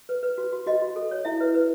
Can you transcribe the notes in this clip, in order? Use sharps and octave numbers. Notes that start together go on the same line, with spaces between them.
B4
B4
F#4
F#4
F#4 D#5
F#4
A4
C#5
E4 E5
B4
B4